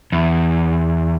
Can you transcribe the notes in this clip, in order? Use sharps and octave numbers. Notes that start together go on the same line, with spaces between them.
E2